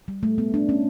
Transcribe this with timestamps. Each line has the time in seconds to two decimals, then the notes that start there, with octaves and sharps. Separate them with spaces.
0.08 G3
0.23 A3
0.38 B3
0.54 D4
0.69 C#4